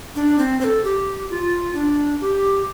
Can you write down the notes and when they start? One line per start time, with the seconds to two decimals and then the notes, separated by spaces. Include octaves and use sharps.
0.16 D4
0.39 C4
0.61 C5
0.64 A4
0.84 G4
1.30 F4
1.75 D4
2.21 G4